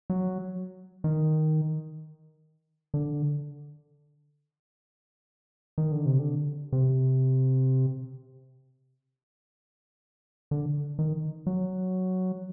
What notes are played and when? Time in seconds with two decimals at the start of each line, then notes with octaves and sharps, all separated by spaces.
0.10 F#3
1.04 D#3
2.94 D3
5.78 D#3
5.92 D3
6.06 C3
6.19 D3
6.72 C3
10.51 D3
10.99 D#3
11.47 F#3